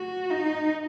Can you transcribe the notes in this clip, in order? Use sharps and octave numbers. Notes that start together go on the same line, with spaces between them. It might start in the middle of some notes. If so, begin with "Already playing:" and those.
Already playing: F#4
D#4